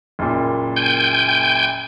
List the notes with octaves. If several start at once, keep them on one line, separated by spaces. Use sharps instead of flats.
F#1 A#2
G5 G#5 G6